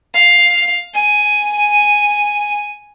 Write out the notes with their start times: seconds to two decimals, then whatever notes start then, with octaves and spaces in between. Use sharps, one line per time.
0.14 F5
0.94 G#5